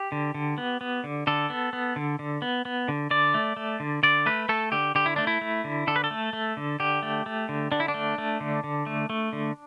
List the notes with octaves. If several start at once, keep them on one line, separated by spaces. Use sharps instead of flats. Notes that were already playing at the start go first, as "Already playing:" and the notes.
Already playing: G4
D3
D3
B3
B3
D3
D3 A4
B3
B3
D3
D3
B3
B3
D3
D3 D5
A3
A3
D3
D3 D5
A3 B4
A3 A4
D3 G4
D3 G4
E4
A3 D4
E4
A3
D3
D3 A4
B4
A4
A3
A3
D3
D3 G4
A3
A3
D3
D3 D4
E4
D4
A3
A3
D3
D3
A3
A3
D3